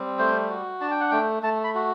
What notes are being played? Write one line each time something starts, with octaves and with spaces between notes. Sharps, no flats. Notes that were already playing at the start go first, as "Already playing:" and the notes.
Already playing: G3 C4
A3 C5
F#4
D4 A5
G5
F#5
A3 G5
A3 A5
B5
F#4